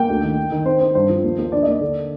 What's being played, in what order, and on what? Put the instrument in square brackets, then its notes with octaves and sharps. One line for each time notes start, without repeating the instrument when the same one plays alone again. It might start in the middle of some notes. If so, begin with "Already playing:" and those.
Already playing: [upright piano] A#3 G5
D2
D#3
D#3
D#3
C4 C5
C4 C5
G2 C5
F3
D#2
D#2
D4 D5
D#5
A#3 D5
D3